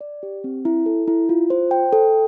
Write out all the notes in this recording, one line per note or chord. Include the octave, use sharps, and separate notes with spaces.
D5
G4
C4
E4
A4
E4
F4
C5
G5
A4